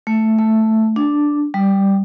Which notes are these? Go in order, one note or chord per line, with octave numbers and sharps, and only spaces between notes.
A3
A3
D4
G3